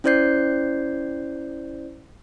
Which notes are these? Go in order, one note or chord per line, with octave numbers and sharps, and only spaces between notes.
C#4 E4 C5 D5 G6 C7